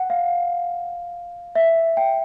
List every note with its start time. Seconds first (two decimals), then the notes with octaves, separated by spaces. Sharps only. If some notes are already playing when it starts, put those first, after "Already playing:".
Already playing: F#5
0.10 F5
1.55 E5
1.97 G5